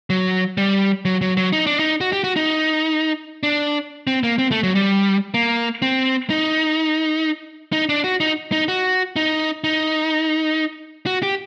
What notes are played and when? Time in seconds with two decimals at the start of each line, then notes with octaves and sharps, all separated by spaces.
0.10 F#3
0.58 G3
1.05 F#3
1.21 F#3
1.37 F#3
1.53 D#4
1.67 D4
1.79 D#4
2.01 F#4
2.13 G4
2.24 F#4
2.36 D#4
3.43 D4
4.07 C4
4.23 A#3
4.38 C4
4.51 A3
4.63 F#3
4.75 G3
5.34 A#3
5.82 C4
6.30 D#4
7.73 D#4
7.89 D4
8.04 F#4
8.20 D#4
8.52 D#4
8.68 F#4
9.16 D#4
9.64 D#4
11.06 F#4
11.23 G4